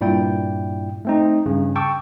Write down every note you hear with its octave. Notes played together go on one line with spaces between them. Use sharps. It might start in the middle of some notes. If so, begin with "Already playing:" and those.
G2 A#2 E4 D5 G5
A3 C4 D#4
G2 C#3
G5 A5 C#6 D6 E6